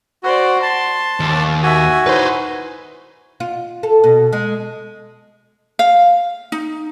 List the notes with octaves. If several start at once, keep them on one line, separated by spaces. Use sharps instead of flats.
F#4 C5 D5
A5 C6
D#2
F#4 E5 G#5
D#4 E4 B4 C5
F4
A4
B2
G#3
F5
D#4